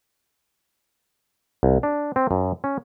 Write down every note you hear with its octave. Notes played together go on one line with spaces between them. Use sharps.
C2
D4
C4
F#2
C#4